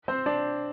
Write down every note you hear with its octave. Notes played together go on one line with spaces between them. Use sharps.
C4 C5
D4 D5